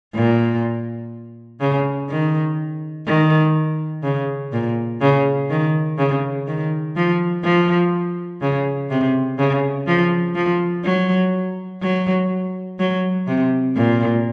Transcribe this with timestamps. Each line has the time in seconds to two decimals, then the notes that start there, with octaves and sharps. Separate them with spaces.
0.15 A#2
1.60 C#3
2.09 D#3
3.06 D#3
4.03 C#3
4.53 A#2
5.01 C#3
5.50 D#3
5.98 C#3
6.47 D#3
6.96 F3
7.44 F3
8.41 C#3
8.90 C3
9.38 C#3
9.87 F3
10.35 F3
10.84 F#3
11.82 F#3
12.79 F#3
13.27 C3
13.76 A#2